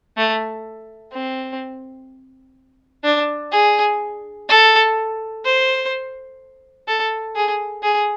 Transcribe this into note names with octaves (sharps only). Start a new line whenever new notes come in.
A3
C4
D4
G#4
A4
C5
A4
G#4
G#4